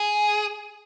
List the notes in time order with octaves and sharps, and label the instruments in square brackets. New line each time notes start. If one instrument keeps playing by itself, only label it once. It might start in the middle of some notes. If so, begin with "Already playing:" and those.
Already playing: [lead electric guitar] G#4